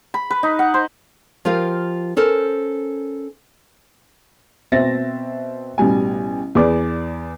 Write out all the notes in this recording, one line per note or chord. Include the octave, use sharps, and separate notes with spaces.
B5
B4
D#4
F#5
C5
F3 F4 G4 A#4 F5
C#4 A4 A#4 C5
B2 C4 E5 A6 A#6
A1 B2 G3 G#5
E2 G#4 B4 D5 D6